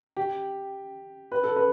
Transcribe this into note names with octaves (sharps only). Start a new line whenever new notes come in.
G4
B4
A4
B4